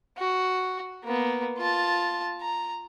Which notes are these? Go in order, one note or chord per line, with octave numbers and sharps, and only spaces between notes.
F#4
A#3 B3
F4 A5
A#5